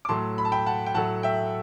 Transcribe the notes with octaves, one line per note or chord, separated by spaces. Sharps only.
D6
A2 F#3 A3 A5 C6
B5
A5
G5 B5
F#5 A5
G5
A2 F#3 A3 F#5 A5
E5 G5